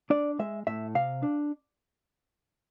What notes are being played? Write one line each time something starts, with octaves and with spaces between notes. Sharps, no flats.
D4 D5
G#3 E5
A2 E5
C3 F5
D4